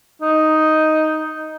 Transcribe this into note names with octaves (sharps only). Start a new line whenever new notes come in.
D#4